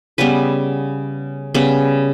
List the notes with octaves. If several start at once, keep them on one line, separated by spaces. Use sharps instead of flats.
C#3 G3 B3 B4
C#3 G3 B3 B4